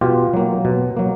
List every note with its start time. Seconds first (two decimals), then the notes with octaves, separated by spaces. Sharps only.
0.01 B2 F4 G4
0.34 F#3 A#3
0.65 B2
0.97 F#3 A#3